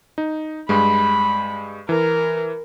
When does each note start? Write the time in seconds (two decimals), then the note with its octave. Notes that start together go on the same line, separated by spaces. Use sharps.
0.18 D#4
0.69 G2 G#3 B5
1.89 E3 A#4